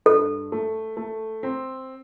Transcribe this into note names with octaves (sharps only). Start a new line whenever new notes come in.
G2 A4
A3
A3
C4